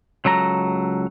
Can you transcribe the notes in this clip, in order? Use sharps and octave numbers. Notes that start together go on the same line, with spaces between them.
C#2 F#3 A4 A#5